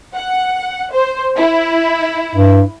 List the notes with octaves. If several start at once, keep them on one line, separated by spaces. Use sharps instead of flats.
F#5
C5
E4
G2